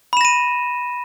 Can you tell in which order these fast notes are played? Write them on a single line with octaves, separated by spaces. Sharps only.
B5 E7 A#6 D#7